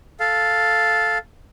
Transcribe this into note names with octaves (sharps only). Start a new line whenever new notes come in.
A4 F5